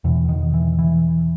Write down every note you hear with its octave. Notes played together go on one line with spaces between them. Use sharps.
E2 B2 E3
D#3
E3
E3